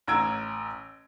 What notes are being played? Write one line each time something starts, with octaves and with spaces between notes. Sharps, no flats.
A1 A#5 E6 G#6 D7